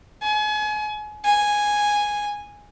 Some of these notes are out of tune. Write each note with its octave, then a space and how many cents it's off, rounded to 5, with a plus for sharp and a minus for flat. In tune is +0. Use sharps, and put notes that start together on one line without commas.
G#5 +35
G#5 -5